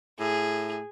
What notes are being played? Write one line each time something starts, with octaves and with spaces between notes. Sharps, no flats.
A2 G#4